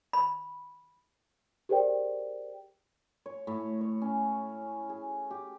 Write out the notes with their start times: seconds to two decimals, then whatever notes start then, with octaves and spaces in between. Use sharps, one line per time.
0.13 B5
1.69 G4 G#4 A#4 C5 D5 G5
3.26 C#5
3.47 A2
3.81 C#5
4.02 C#4
4.89 G#4
5.31 G4